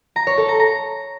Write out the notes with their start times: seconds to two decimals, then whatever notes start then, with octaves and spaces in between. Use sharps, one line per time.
0.16 A#5
0.27 C#5
0.38 A4
0.49 A#5
0.60 A#5